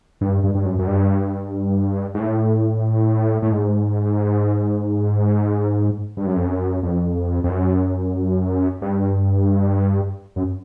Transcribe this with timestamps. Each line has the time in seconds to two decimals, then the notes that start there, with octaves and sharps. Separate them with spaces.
0.21 G2
0.44 G2
0.55 G2
0.65 F#2
0.79 F#2
0.87 G2
2.14 G#2
2.20 A2
3.42 A2
3.52 G#2
6.17 G2
6.27 F#2
6.36 F2
6.46 F#2
6.83 F2
7.44 F2
7.49 F#2
8.82 G2
10.36 F#2